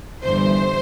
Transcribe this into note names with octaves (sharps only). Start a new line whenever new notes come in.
G1 G2 E3 C5